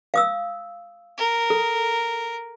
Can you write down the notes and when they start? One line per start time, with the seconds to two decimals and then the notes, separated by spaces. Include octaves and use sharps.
0.14 F5 D#6 E6
1.18 A#4
1.50 A4